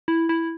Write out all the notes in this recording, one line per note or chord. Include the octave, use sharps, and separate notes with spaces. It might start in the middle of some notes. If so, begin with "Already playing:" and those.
E4
E4